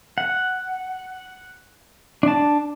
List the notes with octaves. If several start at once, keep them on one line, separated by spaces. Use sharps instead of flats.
F#5
D4 A5